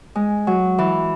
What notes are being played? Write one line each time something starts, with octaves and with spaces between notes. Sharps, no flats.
G#3
F#3
E3